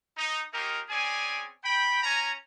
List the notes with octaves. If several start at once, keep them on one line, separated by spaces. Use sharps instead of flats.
D#4
A#3 C#4 D#4 F4 G4 A#4
C4 C#4 G#4 D5 G#5
G5 B5
C#4 G#5 A#5